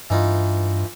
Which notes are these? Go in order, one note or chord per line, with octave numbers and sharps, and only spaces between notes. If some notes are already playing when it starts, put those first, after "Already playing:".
G2 E3 D#4 F4